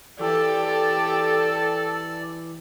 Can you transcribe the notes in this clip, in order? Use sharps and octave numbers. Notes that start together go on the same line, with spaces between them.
E3 G4 A4 D5